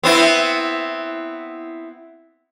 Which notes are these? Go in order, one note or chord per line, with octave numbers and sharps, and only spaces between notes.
B3 C4 E4